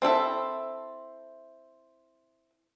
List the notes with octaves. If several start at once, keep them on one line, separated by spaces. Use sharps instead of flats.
C4 E4 A4 E5